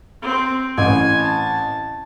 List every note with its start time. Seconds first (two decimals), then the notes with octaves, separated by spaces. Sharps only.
0.22 C4
0.78 A1 G#5
1.21 A5